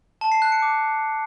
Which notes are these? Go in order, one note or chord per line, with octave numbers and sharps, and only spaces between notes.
A5
C7
F#6
C#7
D6